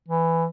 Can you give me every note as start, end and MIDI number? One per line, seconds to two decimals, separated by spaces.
0.09 0.46 52